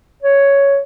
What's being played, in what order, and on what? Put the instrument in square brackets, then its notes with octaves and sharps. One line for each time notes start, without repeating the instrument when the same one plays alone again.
[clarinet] C#5